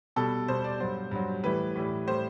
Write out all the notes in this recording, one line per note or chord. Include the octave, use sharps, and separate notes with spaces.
B2 G3 A4
B2 G3 C5
D5
G2 F#3 C5
G2 F#3
A2 E3 G3 B4
A2 E3 G3
A2 G3 C5